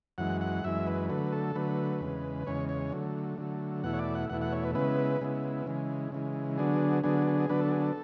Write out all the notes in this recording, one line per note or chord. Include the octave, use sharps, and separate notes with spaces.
F#2 E3 G#3 F#5
F#5
F#2 E3 G#3 E5
B4
D3 F#3 A3 B4
A4
D3 F#3 A3 B4
E2 C#3 G#3
E2 C#3 G#3 C#5
C#5
D3 F#3 A3
D3 F#3 A3
E2 B2 A3 E4 F#5
C#5
D5
F#5
E2 B2 A3 E4 F#5
F#5
C#5
B4
C#3 G#3 B3 E4 B4
C#3 G#3 B3 E4
C#3 E3 G#3
C#3 E3 G#3
D3 F#3 B3 D4 G#4
D3 F#3 B3 D4 G#4
G#4
D3 F#3 B3 D4 B4
A4
G#4
A4